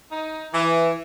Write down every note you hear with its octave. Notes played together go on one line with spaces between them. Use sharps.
D#4
E3